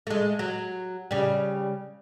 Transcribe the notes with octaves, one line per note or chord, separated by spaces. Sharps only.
G#3 A3
F#3
C#3 G3